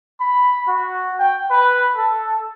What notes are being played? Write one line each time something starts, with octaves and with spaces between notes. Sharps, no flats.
B5
F#4
G5
B4
A4